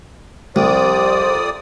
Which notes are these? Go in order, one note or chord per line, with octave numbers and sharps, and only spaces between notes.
C2 F2 G3 C5 D5 D#6